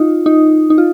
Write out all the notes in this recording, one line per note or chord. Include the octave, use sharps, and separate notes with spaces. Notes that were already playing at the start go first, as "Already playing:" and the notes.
Already playing: D#4 F4
D#4
D#4
F4